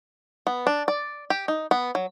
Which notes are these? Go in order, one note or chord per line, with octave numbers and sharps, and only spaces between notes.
B3
D4
D5
G4
D#4
B3
F#3